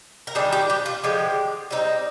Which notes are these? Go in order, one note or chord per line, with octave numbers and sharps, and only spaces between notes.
A#4
D#3 G3 D4 G#4
G4
G4
F4
D3 F3 G#3 G4
G3 C4 D#4